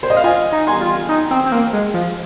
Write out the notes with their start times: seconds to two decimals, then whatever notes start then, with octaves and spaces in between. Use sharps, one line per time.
0.03 C5
0.10 D#5
0.17 F5
0.24 F4 D#5 G#5
0.52 D#4
0.67 G#5 C6
0.81 F4
1.09 D#4
1.31 C4
1.46 C4
1.52 A#3
1.73 G#3
1.94 F3